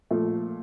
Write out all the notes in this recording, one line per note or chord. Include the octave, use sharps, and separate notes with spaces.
A#2 F3 A3